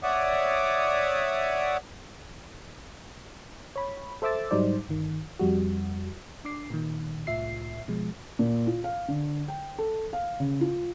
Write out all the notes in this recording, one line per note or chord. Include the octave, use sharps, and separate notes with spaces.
C#5 D5 E5 F#5 D6 D#6
C#5 B5
A4 C5 E5 D6 E6 A6
G#2 F#3 G3 D#4 C5 D5
G1 D#3
F2 G3 F#4
D4 D6 C7
A#2 D#3
C2 A2 F4 E5 C7
B2 F3 G#3
A#2
F4
F5
D3
G5
A4
F5
C#3
F4